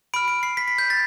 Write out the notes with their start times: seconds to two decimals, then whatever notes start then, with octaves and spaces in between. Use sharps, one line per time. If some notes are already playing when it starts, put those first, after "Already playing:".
0.14 B5 F6 D7
0.28 D7
0.43 C7
0.57 B6
0.68 B6
0.78 G6
0.90 A6